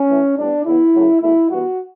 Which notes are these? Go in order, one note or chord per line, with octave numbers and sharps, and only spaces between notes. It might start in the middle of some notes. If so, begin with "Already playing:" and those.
Already playing: C#4
A2 E3 A3
A2 G3 B3 D4
C#3 E3 B3 E4
F#2 C#3 F#3 A3
E2 B2 A3 E4
G2 E3 B3 F#4